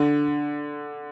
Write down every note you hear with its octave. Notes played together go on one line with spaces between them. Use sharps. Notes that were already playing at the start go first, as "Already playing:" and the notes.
Already playing: D3